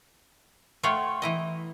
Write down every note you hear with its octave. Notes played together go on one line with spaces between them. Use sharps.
A3 F4 C#5 F#5 G5
E3 E4 D#5